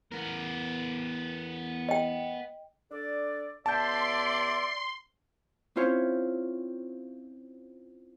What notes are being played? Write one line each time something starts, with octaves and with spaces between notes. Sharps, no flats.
E2 B3 A#4
D#5 G5
D4 A4 D5
C#2 B3 D5 E5 A5 C6 G6
C4 C#4 E4 F4 C5 C#5